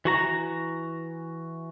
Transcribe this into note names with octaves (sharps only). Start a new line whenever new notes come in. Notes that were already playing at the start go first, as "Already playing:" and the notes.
E3 F#4 A#5